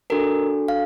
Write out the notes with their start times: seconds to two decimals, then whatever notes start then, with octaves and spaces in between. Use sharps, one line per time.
0.10 D4 F#4 A4 A#4
0.68 F5